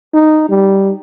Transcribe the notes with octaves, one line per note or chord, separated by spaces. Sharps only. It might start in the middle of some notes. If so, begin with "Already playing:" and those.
D#4
G3